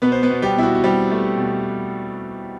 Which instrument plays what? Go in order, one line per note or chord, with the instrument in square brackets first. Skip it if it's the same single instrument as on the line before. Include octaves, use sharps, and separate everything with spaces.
[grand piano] B2 B3 B4
C5
B3 B4
B2
G3 G4
B2 E4
F#4
F#4
G3 C4 G4
A3
B2